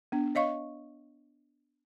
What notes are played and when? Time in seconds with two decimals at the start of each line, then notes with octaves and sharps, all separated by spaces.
0.12 B3 D4
0.35 C#5 D#5 F5 C#6